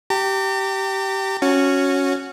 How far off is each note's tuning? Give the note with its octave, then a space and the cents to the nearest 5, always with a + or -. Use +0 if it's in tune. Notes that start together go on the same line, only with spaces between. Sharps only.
G4 -15 A#5 -45
C#4 +0 F#4 -10